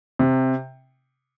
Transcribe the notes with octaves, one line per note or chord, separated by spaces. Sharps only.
C3